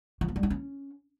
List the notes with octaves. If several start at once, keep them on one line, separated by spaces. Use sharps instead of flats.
F3
B3
G3
D#4
C#4